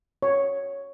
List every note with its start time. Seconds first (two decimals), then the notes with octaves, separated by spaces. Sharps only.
0.22 C#5